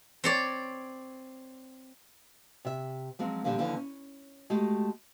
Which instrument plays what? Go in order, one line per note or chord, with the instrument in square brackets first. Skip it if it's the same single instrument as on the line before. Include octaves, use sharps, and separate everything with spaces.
[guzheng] C4 C#5 D5
[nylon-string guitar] C3 E5
F3 F#3 G#3 C4
A#2 D3 F3 G3 G4
D#2 D3 E3 F3 D#4
C#4
G#3 A3 F#4 G4